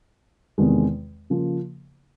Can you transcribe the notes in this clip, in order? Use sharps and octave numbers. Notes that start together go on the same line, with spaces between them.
E2 C3 D#3 G#3
C#3 F3 A#3